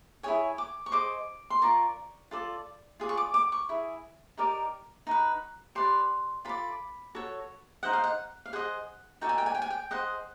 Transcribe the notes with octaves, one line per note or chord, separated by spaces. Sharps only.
E4 G#4 C#5 G#5
D6
C#6
G#4 C5 D#5 D6
C6
F4 A#4 D5 C#6
F4 A4 D5
F4 G#4 D5
C#6
D6
D6
C#6
E4 G#4
D#4 G4 A#4 D5
D#4 F#4 B4
G4 B4 D5 C6
F4 A4 D5 B5
F#4 A4 C#5
D#4 G#4 C5 D#5 F#5
F5
F#5
F5
G#4 C5 D#5 F#5
D#4 F#4 A4 D5 G5
G#5
G5
G#5
G5
G#5
G5
G#4 C5 D#5 F#5